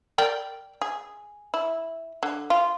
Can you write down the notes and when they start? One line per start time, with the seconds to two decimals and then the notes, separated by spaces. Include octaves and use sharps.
0.18 A#4 D5 G5
0.82 G#4
1.54 E4
2.23 D3
2.50 F4